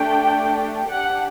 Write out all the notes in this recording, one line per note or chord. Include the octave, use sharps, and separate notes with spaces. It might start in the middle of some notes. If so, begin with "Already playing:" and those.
Already playing: A3 D4 G4 G5
D4 G4 F#5